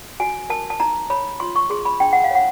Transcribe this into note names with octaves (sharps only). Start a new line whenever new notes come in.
F#4 G#5
A#4 A5
A5
D#4 A#5
C#5 B5
F4 C6
C#6
G#4 C6
B5
D4 G5
F#5
F5
C#5 F#5